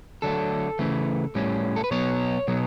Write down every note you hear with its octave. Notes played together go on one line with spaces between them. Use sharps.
D3 F#3 A3 A4
C#3 E3 A3
A2 G3 C#4
A4
B4
B2 F#3 B3 C#5
B2 F#3 B3